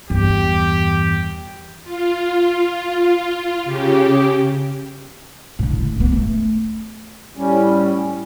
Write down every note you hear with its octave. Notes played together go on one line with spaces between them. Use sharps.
E2 G2 G4
F4
C#3 G4
A2 D3
A3 B3
A3
A2 G3 C#4